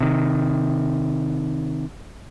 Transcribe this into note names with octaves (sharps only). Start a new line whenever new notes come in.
C3 D#3